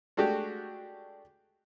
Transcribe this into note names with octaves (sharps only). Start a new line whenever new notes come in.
G#3 A3 D4 F#4 G4